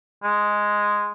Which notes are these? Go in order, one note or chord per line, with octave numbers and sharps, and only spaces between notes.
G#3